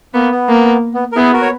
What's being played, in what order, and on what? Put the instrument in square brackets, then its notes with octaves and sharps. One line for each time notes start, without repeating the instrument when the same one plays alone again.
[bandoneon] A#3 [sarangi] B3
[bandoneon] B3
[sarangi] A#3
[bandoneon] B3
A#4
[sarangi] B3 [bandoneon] E4 G#4
[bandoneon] F#4 A#4
C#5